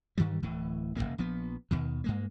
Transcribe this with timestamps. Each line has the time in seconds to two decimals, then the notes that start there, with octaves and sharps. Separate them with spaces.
0.18 G2 D#3 E3 G3
0.43 D1 A2 E3
0.96 E1 D#2 C#3 A#3
1.18 A#1 F3 B3
1.71 D#2 B2 D#3
2.04 G2 G#3 A#3